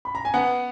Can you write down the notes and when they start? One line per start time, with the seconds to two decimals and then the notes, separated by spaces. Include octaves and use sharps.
0.05 B5
0.15 A#5
0.25 G#5
0.34 B3 F#5